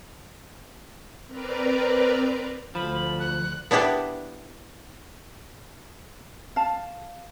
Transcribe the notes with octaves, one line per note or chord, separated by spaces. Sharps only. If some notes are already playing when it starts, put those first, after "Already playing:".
C4 A#4 B4 D5 A#5
D2 D3 F3 B5
F#6
B3 D4 E4 G4 A4 B4
F5 A5